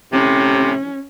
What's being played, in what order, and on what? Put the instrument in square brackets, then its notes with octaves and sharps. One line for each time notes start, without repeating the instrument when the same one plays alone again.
[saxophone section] A2 C3 [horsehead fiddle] C#4